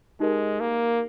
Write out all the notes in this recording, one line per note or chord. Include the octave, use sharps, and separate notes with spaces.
G#3 D#4 G4 A#4 D#5
A#3